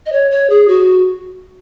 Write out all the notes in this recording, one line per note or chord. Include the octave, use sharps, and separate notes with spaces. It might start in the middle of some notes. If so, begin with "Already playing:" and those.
D#5
C#5
C#5
G#4
F#4